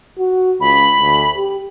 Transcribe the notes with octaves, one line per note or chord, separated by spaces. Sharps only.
F#4
C#2 B5
D2
G4